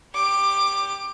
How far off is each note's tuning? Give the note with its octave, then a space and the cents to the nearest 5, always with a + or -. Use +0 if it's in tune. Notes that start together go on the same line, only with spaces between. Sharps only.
G4 +10 D6 +15